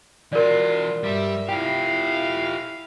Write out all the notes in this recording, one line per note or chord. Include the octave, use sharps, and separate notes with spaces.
E3 F4 F#4 A#4 D5
G2 G3 E5
E4 F4 G4 F5 G5